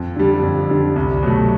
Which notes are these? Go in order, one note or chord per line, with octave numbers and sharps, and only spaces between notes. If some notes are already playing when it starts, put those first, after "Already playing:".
Already playing: F2
D3 G3
F2
D3 G3
C2
B2 F#3 A3